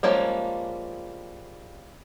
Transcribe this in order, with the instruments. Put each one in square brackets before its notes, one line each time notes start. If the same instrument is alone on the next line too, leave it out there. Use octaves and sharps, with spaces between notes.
[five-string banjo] F3 G3 G#3 A#3 C#4